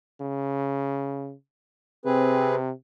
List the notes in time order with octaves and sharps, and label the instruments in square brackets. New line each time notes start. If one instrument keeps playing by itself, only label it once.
[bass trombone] C#3
[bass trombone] C3 [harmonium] C4 G#4 B4